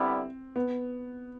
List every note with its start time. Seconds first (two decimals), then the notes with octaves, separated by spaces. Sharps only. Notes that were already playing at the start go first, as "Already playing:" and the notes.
Already playing: D3 G3 B3 C4 E4
0.56 B3